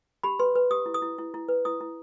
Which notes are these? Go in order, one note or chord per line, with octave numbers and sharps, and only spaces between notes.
G4 B5
B4 C6
B4
G4 D#6
E4
D#6
E4
E4
E4
B4
E4 D#6
E4